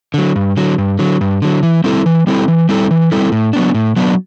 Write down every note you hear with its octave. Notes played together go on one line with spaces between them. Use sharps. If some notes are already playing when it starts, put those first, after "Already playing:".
D3 F#3
G2
D3 F#3
G2
D3 F#3
G2
D3 F#3
E3
G3 C4 E4 A4
E3
G3 C4 E4 A4
E3
G3 C4 E4 A4
E3
G3 C4 E4 A4
A2
F#3 B3 D4
A2
F#3 B3 D4